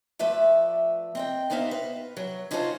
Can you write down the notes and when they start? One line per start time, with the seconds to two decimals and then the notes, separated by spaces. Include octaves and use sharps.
0.19 F3 A3 B4 D5 E5
1.15 C4 D#5 G5
1.50 D#2 B3 D#4 C5 E5 F5
1.71 B4
2.17 F#3
2.51 C#4 D#4 F4 F#4 A4 C5